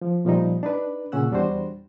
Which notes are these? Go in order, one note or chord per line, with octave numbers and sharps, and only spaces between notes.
F3
A#2 F3 G3 D#4
D4 D#4 B4
A#2 C#3 C#4 F#5 E6 F#6
E2 G3 D4 F#4 C5